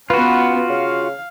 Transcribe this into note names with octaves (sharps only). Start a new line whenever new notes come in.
B3 C#4 F4 F#4 B4
C#3 F5